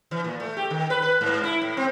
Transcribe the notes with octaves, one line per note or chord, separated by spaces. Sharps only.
E3
A#2
A3
G4
D#3
B4
B4
G#2
E4
A2
C4